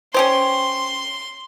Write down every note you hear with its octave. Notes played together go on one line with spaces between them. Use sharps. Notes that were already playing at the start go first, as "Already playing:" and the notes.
C#4 G4 C5 C6